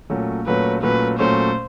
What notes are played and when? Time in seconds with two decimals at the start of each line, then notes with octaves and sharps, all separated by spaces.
0.10 A#2 F#3 A3 C#4
0.46 A#2 F#3 A3 C#4 B4
0.82 A#2 F#3 A3 C#4 B4
1.19 A#2 F#3 A3 C#4 C5